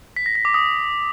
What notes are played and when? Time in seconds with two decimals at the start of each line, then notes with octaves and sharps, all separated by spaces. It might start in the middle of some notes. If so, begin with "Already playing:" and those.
0.16 B6
0.26 A#6
0.35 B6
0.45 D6
0.54 D#6